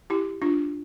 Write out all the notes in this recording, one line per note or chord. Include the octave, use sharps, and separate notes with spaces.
E4 G4
D4 F4